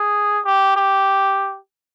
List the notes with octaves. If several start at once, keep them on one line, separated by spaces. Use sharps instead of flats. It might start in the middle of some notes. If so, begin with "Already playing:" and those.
Already playing: G#4
G4
G4